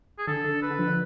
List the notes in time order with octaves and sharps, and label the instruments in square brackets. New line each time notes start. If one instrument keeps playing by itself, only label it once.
[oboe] G#4
[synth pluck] D3 [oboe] A4
[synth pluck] D3
[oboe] B4
[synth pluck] D3
F3
D3